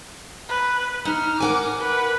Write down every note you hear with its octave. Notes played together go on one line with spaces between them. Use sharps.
B4
D#4 F6
A#4 F#5 G#5 D6
B4